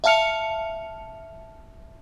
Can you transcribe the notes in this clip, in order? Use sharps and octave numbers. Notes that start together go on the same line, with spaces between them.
E5 F5 A5 F6 C#7 F7